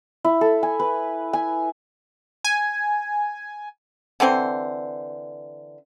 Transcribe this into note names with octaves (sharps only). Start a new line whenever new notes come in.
E4
A4
G#5
B4
G#5
G#5
D3 E3 C4 C5